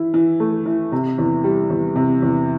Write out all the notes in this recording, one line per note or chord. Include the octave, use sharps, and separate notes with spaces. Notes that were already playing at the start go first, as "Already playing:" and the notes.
Already playing: E3 E4
E3
A3
E3
C3
E2
G3
E2
C3
E2